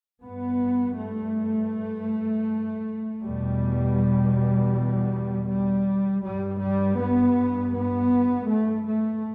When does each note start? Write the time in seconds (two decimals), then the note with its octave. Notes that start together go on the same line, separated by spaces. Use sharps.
0.23 G2 B3
0.99 A3
3.24 E2 B2 G3
5.49 G3
6.24 G2 G3
6.62 G3
7.00 B3
7.75 B3
8.50 A3
8.87 A3